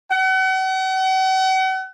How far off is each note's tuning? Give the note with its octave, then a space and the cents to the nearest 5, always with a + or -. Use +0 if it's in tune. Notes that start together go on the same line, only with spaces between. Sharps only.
F#5 +40